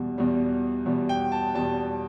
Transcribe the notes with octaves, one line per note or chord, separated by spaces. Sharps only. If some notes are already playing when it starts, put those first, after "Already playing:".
Already playing: E2 B2 G3
E2 B2 G3
E2 B2 G3
G5
A5
E2 B2 G3 A5